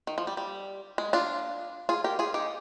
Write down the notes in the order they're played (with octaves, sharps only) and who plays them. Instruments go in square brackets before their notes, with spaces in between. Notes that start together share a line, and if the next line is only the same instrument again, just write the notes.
[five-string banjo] D#3
F3
G3
G3
G#3
D4 F4
F4 G#4
G4 A#4
F4 G#4
D#4 G4